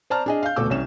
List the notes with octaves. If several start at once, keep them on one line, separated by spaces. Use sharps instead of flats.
C5 D5 A5 A#5 F6
D4 G#4 D#5
F5 G6
E1 D2 B2 A4 D6 E6
C2 C#4 E7